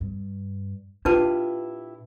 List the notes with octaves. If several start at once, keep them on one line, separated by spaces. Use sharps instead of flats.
G2
A#2 D4 E4 F4 G4 B4 A5